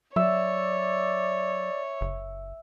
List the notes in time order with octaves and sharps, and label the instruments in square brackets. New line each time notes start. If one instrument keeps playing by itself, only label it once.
[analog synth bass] F#3 [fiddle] C#5 [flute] D5 [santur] E5
[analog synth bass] F#1